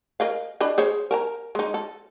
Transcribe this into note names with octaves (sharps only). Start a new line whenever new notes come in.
A#4 D#5 F5
D4 D#5 B5
G#4 C5 C#5
A#4 A5 A#5
G#3 D#4
A4